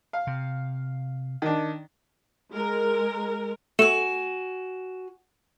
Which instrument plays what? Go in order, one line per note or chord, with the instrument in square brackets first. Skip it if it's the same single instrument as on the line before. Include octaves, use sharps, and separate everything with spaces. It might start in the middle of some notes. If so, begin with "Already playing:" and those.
[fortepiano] F5
[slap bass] C3
[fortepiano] D#3 D4
[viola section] G#3 A#4
[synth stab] A3 [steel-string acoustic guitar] F#4 G#5 [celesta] E7